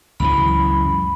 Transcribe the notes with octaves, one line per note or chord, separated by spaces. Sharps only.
C#2 F#2 E3 B5